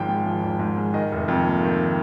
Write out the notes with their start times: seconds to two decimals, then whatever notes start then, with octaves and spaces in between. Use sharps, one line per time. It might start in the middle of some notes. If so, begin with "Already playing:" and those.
Already playing: G#1 G#2 F3 G5
0.08 G#3
0.26 F3
0.43 G#1
0.59 G#2
0.77 G#3
0.94 D#3 D#5
1.12 F1
1.28 F2
1.45 A#3
1.63 D#3